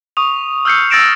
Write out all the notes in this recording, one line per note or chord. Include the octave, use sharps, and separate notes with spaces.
C#6 D#6 F7
E6 F6 G6 C7 C#7
E6 A6 A#6 D7 E7